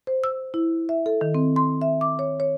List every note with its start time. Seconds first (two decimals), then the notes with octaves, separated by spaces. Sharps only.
0.07 C5
0.24 E6
0.54 E4
0.89 E5
1.06 A4
1.21 D#3
1.35 C4
1.56 C6
1.82 E5
2.01 D6
2.19 C#5
2.40 C#5